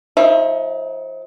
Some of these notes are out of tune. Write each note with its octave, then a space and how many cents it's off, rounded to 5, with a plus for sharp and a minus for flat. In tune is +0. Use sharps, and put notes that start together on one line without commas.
F3 +25 D#4 +40 E5 +10